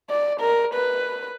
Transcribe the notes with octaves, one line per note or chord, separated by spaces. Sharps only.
D5
A#4
B4